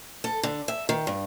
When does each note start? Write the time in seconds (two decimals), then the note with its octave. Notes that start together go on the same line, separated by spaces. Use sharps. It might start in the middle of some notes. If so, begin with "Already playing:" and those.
0.24 A4
0.43 D3
0.68 E5
0.89 D#3
1.07 G2